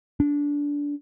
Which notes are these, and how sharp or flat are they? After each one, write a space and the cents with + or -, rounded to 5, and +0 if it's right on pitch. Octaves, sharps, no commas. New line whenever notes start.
D4 -20